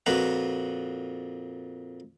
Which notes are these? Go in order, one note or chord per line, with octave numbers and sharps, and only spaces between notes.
F2 A#2 F#4 B4 A#5